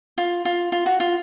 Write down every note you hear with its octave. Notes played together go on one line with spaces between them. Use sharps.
F4
F4
F4
F#4
F4